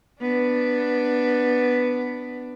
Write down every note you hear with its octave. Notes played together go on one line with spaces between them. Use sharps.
B3 D4